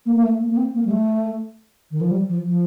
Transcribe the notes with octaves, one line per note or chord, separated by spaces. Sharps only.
A#3
A#3
A3
A#3
A#3
C4
A#3
G3
A3
D#3
F3
G3
F3
F3